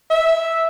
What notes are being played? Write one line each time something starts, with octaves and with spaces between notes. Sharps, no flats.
E5